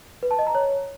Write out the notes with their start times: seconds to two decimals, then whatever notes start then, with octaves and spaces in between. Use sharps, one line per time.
0.23 B4
0.31 A5
0.39 D#5
0.47 A#5
0.55 C#5